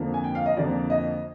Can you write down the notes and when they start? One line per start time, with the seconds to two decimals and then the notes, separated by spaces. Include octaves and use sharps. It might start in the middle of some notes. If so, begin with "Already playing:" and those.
Already playing: F2 D3 F3 A#3
0.14 G#5
0.24 G5
0.35 F5
0.46 D#5
0.57 F2 D3 F3 A#3 D5
0.90 D#5